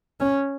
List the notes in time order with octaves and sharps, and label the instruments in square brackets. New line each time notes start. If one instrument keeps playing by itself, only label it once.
[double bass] C#4